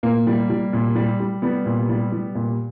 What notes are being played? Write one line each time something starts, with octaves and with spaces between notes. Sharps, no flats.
A#2 A#3
G3
G3
A#2
G3
G3
G3 B3
A#2
G3
G3
A#2